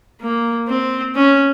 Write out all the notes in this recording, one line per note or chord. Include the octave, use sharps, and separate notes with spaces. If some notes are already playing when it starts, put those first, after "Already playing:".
A#3
C4
C#4